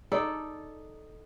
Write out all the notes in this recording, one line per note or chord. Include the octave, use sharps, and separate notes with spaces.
D#4 A4 D5